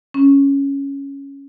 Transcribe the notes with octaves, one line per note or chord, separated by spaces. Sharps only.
C#4